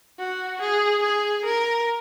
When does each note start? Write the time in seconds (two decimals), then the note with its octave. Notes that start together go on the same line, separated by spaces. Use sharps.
0.19 F#4
0.62 G#4
1.03 G#4
1.45 A#4